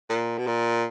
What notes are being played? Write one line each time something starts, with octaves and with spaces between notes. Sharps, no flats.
A#2
B2
A#2